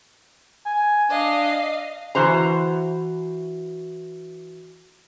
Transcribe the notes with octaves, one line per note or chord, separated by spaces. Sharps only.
G#5
D4 D#5 F5
E3 F#4 C5 A#5